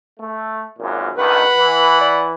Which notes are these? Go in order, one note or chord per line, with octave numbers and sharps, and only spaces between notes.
A3
G#1 F#2 A#2
C#2 G2 D#3 B4 F#5 B5
E3
D5